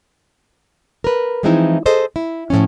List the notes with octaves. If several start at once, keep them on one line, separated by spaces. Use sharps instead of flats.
A#4 B4
E3 F3 G#3 C4 D#4 E4
G#4 A4 C5 D#5
E4
A2 F3 A#3 C#4